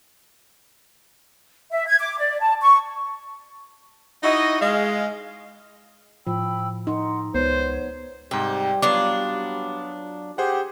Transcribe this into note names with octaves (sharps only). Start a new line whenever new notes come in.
E5
G#6
D6
D5
A5
C#6
D#4 E4 F#4 D#5
G#3 F5
A2 F3 G5 B5 E6
D#4 F#5 C6
C#2 B3 C5 C#5
G#2 C3 G3 G5
F#3 B3 D4 F4 D6
G4 G#4 C5 F#5